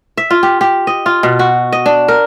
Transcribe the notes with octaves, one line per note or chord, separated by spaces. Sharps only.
E5
F4
G4
G4
D#5
F4
B2
F#4
D#5
D4
A#4